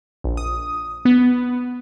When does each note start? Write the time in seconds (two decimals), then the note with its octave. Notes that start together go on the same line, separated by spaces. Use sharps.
0.24 A#1
0.37 D#6
1.05 B3